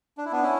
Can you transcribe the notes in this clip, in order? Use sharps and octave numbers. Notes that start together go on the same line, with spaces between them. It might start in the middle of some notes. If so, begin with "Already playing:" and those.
D4
E4
B3 D4
C#4 E4